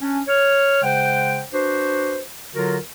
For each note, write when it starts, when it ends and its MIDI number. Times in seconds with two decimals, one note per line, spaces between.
0.01 0.20 61
0.01 0.20 62
0.28 0.80 73
0.28 0.80 89
0.83 1.41 49
0.83 1.41 56
0.83 1.41 72
0.83 1.41 78
0.83 1.41 79
1.53 2.19 62
1.53 2.19 66
1.53 2.19 71
1.53 2.19 72
2.54 2.77 50
2.54 2.77 54
2.54 2.77 65
2.54 2.77 66
2.54 2.77 70